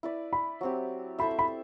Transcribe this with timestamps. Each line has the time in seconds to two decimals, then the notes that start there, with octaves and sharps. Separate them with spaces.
0.03 E4 B4 D5
0.33 B5
0.61 F#3 C4 G4
1.19 E4 A4 C5 E5 B5
1.39 B5